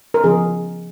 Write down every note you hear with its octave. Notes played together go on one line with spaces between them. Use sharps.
A#4
C#3 F3 B3 G#4